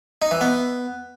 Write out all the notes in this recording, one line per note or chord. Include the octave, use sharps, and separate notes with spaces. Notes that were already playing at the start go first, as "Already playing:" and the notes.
D#4
E3
B3